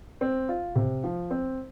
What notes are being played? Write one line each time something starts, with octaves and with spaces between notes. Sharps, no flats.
C4
F4
C3
F3
C4